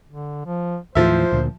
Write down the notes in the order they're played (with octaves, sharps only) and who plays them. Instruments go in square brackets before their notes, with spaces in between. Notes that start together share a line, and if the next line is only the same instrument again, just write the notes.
[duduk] D3
F3
[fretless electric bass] D#2 A2 E3 [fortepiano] F3 E5 [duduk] C5
[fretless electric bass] D2 A#2